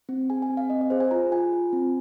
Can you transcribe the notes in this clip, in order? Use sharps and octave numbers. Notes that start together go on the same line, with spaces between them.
C4
G#4 G#5
G#5
C4
F5
C4 D#5
D#5
G#4 C5
G#5
F4 A#5
F4 G#5
F4
C4